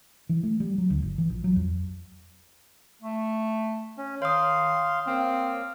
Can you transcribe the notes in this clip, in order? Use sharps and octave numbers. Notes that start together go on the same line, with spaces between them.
E3
A3
G3
F#3
D2
G1
E3
A#1
F#3
F2
A3
C#4
D#3 C#5 F5 C6 D#6
A#3 C4 F5